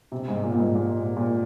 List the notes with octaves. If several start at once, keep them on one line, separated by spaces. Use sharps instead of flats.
C3
G#2
A#2
A#2
G#2
A#2
A#2